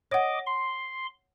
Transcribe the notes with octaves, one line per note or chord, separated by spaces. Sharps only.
C#5 D#5 F#5 D6
C6